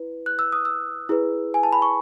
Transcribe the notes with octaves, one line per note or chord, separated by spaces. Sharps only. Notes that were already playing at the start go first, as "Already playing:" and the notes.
Already playing: E4 B4
F#6
E6
D#6
E6
E4 G#4 B4
G#5
A5
B5
C#6